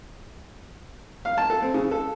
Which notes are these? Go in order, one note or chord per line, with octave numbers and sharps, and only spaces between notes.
F5
A5
A4
C4
C#3
A4